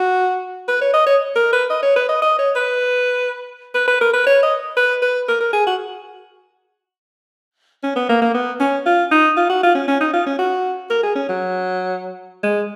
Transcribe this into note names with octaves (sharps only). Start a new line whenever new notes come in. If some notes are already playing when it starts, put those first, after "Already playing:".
Already playing: F#4
B4
C#5
D#5
C#5
A#4
B4
D#5
C#5
B4
D#5
D#5
C#5
B4
B4
B4
A#4
B4
C#5
D#5
B4
B4
A#4
A#4
G#4
F#4
C#4
B3
A#3
A#3
B3
C#4
F4
D#4
F4
F#4
F4
C#4
C#4
D#4
F4
C#4
F#4
A#4
G#4
C#4
F#3
G#3